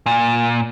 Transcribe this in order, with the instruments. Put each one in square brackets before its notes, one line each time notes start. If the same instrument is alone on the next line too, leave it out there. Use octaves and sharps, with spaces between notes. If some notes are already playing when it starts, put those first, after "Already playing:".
[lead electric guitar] A#2